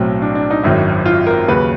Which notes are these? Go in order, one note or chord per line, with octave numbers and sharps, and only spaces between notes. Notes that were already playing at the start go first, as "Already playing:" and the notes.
Already playing: B1 A2 F#3 C4
D4
D4
D#4
G#1 F#2 D#3 F#3 E4
F4
A#4
D#2 C#3 F#3 B4